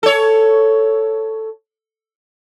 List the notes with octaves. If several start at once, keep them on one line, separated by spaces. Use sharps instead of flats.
A4 C#5